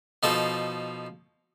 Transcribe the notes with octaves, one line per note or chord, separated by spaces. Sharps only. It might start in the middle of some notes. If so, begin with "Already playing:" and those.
B2 F3 D#4 A4